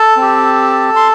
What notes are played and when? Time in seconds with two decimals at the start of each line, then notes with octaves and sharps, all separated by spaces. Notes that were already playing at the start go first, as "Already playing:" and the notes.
Already playing: A4 A5
0.17 C4 G4
0.96 C6